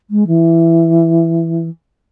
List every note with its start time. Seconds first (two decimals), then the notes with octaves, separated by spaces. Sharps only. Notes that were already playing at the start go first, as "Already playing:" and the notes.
0.10 G#3
0.27 E3